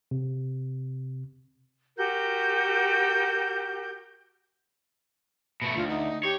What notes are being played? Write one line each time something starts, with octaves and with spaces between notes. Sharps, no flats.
C3
F#4 G4 A#4 G6
B2 A3
D2 F4
D#4
G4 C#5